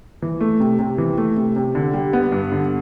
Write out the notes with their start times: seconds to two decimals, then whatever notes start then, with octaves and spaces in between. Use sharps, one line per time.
0.22 E3
0.41 A3
0.60 C3
0.79 C3
0.98 E3
1.18 A3
1.37 C3
1.56 C3
1.75 D3
1.93 G3
2.13 B3
2.32 G2
2.52 D3